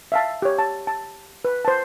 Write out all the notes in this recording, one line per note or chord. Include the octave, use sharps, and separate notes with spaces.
E5 F5 A5
G4 C#5
A5
A5
B4
C5 A5